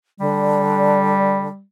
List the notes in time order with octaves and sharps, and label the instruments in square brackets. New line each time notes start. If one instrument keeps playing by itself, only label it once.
[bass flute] D3 [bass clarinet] G3